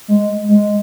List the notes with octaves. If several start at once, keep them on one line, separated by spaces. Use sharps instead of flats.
G#3
G#3